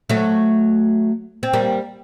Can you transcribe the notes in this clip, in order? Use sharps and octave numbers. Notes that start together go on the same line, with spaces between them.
F#3 A3
C4
G3 A#3